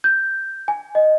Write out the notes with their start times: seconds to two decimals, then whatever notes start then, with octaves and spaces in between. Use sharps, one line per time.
0.04 G6
0.68 G#5
0.95 D#5